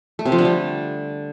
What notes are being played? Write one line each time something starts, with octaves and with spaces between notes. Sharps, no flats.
A3
C3
F3
D3
G3